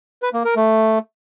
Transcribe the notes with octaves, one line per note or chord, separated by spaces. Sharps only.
B4
A#3
A#4
A3